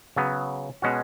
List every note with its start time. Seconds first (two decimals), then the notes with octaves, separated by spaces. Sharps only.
0.16 C#3 F#3 B3
0.82 B2 G#3 C#4 F#4